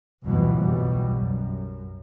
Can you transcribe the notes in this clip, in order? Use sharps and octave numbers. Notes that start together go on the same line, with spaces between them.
F#1 D2 G2 B2 E3 F3
B1 F2 B2 G3
F#2